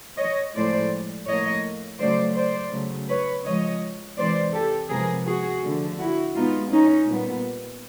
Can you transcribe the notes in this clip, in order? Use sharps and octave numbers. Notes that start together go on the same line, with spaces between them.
C#5 D#5
A2 F3 G#3 C5 D5
A2 F3 A#3 C#5 D#5
C#3 F#3 A3 C5 D5
C5 D5
C#3 F#3 A3
B4 C#5
C#3 F3 G#3 C#5 D#5
C3 E3 G#3 C5 D5
G4 A4
C3 F3 G#3 B3 G#4 A#4
F#4 G#4
D3 F3 A3
E4 F#4
B2 G#3 B3 D#4 F4
C#4 D#4
A#2 G3 B3